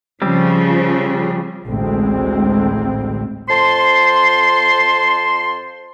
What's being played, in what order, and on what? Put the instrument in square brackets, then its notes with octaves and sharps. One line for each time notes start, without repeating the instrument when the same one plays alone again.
[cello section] C#3 F3 [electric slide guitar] G3 C4
[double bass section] A1 D2 A2 G#3 C4
[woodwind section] F2 C5 A5 C6